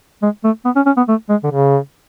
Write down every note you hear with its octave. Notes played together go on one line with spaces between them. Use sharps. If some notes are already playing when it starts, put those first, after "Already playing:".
G#3
A3
B3
C#4
C#4
B3
A3
G#3
D3
C#3